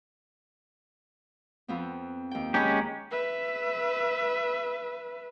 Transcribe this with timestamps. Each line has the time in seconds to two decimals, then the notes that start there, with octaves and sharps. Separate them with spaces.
1.68 F2 B3 C4
2.31 D#2 G5
2.54 G#3 C#4 G4 A#5 B5
3.11 B4 E5